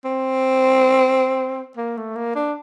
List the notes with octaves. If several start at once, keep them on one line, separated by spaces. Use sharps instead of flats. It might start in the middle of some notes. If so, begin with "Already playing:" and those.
C4
A#3
A3
A#3
D4